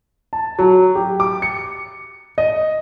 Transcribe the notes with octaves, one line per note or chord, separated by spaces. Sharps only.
A5
F#3
G4
D6
C#7
D#5